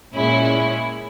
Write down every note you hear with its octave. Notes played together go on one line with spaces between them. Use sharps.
A#2 G#3 C#4 E4